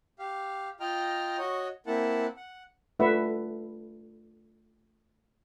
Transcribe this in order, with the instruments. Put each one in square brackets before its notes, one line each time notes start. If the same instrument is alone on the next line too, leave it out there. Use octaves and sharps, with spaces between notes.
[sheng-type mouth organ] G4 F5
F4 D#5 G5 A#5 F6
F#4 C#5 D#5
A#3 C4 E4 F#5 A5
F#5
[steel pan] A3 D4 F4 B4 E5 F#5